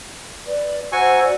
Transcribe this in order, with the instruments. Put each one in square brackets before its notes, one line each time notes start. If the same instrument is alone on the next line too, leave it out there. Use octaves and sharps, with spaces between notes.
[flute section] B4 D5
[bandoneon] F#4 G#5 C#6 [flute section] C5 A#5 E6
[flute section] F#4 D5